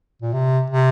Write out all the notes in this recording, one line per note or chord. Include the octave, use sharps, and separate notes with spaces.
A#2
C3
C3